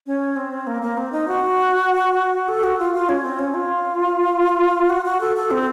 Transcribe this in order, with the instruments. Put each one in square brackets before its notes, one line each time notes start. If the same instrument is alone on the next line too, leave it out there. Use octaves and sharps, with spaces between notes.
[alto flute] C#4
C4
A#3
A#3
C4
D#4
F#4
A4
F#4
F4
F4
C#4
C4
C#4
F4
F#4
F#4
A4
A4
C4